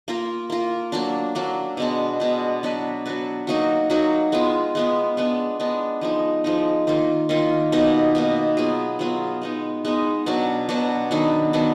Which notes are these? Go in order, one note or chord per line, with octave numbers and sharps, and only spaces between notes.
A#3 F4 A#4
A#3 F4 A#4
F#3 A#3 D4
F#3 A#3 D4
B2 G#3 D4
B2 G#3 D4
F#3 D4 F#4 B4
F#3 D4 F#4 B4
F#3 A#3 D#4 F#4
F#3 A#3 D#4 F#4
G#3 B3 F4
G#3 B3 F4
G#3 B3 D4
G#3 B3 D4
F3 G#3 D#4
F3 G#3 D#4
D#3 A#3 F4
D#3 A#3 F4
B2 A#3 D#4
B2 A#3 D#4
F#3 B3 F4 G#4
F#3 B3 F4 G#4
G#3 B3 D#4
G#3 B3 D#4
B2 F#3 D4 F#4
B2 F#3 D4 F#4
D#3 F#3 B3 D4
D#3 F#3 B3 D4